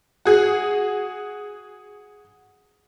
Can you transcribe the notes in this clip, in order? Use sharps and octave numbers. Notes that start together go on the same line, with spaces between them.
F#4 G#4